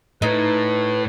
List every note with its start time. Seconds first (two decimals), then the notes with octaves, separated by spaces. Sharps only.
0.22 A2 D#4 B4